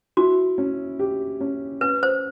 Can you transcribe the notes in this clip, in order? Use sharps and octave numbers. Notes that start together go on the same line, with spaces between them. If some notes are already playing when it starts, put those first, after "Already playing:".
E4 F#4
C#4
G4
C#4
C#4 B4
C5